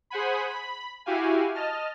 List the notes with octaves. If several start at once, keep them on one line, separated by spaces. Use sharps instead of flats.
G#4 C5 F#5 G#5 B5
B5
E4 F#4 G4 F5 G#5
D#5 A5 F6